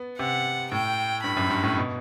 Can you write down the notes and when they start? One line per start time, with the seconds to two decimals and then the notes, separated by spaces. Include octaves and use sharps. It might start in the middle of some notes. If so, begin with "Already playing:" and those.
Already playing: B3
0.19 C3 F#5
0.72 A2 G5
1.23 G2 B5
1.37 F#2
1.50 G2
1.64 A2
1.77 B2